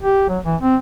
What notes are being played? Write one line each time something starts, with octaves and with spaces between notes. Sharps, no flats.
G4
F#3
E3
C4